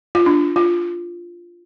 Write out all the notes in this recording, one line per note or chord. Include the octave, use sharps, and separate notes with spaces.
F4
D4
F4